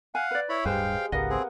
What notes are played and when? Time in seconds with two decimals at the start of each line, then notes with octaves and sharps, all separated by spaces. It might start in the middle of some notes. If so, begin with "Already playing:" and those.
0.15 F5 F#5 G#5
0.31 B4 D5
0.49 E4 C#5 B5
0.65 D1 G2 G#3 G4 B4 C5 F5 G5
1.12 G#1 C#2 A#3 B3 D#5 F#5
1.30 C4 G#4